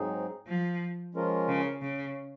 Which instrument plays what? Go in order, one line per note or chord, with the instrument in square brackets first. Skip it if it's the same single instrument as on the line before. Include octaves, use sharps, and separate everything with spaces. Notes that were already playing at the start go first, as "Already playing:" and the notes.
Already playing: [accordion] G#2 F#3 C4 D#4 G#4
[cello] F3
[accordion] F3 G#3 C#4 F4 A#4
[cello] C#3
C#3